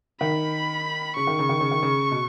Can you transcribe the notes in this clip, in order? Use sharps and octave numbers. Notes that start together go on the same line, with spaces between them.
D#3 B5
C#3 C#6
D#3
C#3
D#3
C#3
D#3
C#3
B2